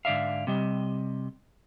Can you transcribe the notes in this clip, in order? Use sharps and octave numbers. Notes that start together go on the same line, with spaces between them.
G#2 D3 D5 E5 F5
C3 G3 D#5